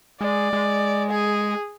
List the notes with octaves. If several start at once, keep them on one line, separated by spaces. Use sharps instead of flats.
G#3 D5
G#3
G#4